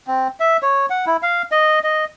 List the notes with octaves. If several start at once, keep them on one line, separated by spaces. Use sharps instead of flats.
C4
E5
C#5
F#5
E4
F5
D#5
D#5